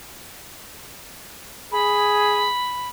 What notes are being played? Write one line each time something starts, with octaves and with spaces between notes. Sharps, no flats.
G#4 B5